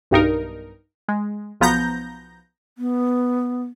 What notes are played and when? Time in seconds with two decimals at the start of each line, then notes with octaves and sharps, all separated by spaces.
0.11 B1 G2 D#4 A#4
1.08 G#3
1.61 B1 F3 B3 A#5 G6 A#6
2.78 B3